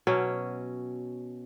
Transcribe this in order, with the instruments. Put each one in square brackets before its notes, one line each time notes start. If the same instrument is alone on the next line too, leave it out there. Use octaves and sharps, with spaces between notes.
[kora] B2 F#3 C#4